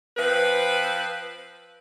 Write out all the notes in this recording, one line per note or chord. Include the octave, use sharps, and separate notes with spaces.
F3 C4 B4